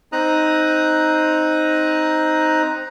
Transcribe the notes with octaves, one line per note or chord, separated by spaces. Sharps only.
C4 D#4 A#5 D#6 F#6